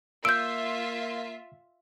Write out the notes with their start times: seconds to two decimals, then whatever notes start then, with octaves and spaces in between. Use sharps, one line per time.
0.25 A#3 F4 E5 E6 G6 D7